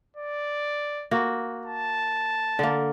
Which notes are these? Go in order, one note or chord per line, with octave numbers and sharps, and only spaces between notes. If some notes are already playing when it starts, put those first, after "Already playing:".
D5
A#3 F#4
A5
D3 A#3